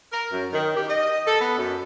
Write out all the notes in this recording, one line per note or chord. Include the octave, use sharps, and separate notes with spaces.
A#4
F#2
D#3
G4
D#5
A4
B3
F#2